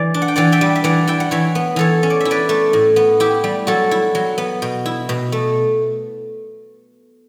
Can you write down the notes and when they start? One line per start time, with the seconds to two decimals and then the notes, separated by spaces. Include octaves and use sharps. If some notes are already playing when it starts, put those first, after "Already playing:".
Already playing: E3 D5
0.14 D4
0.22 F#5
0.28 G5
0.36 E3 D5 F#5
0.52 E5 G5
0.61 G3
0.76 E5
0.84 E3 D5 F#5
1.07 E4 G5
1.20 F#5
1.31 E3 C#5 E5
1.55 B3
1.76 E3 A4 C#5
2.03 C#4
2.10 D5
2.20 E4 E5
2.31 B4 D5
2.49 A3
2.73 A2
2.96 B3
3.20 E4 G4
3.44 G3
3.67 F#3 F#4 A4
3.91 E4
4.15 F#3
4.38 B3
4.62 B2
4.86 E4
5.09 B2
5.32 A3